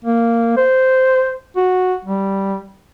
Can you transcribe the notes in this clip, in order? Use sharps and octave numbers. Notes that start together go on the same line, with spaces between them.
A#3
C5
F#4
G3